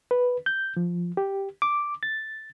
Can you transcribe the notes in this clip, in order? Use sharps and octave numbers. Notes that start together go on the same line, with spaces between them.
B4
G6
F3
G4
D6
A6